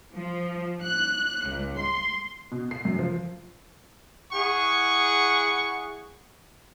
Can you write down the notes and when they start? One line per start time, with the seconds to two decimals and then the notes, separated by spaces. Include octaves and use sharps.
0.14 F3
0.83 F#6
1.47 C#2
1.77 C6
2.52 B2
2.71 C7
2.85 F#2
2.99 F3
4.33 E4 G#4 F#5 C#6